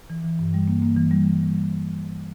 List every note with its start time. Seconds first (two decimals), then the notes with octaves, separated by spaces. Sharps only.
0.10 E3
0.25 E3
0.39 G2
0.54 G3
0.68 A#3
0.82 A#3
0.97 E3
1.11 G3